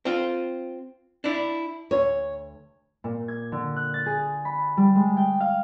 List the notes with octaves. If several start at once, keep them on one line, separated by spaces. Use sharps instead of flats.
C4 F4
D4 E4
D2 C#5
A#2
G#6
D3
F#6
A6
G#4
B5
G3
G#3
G5
F5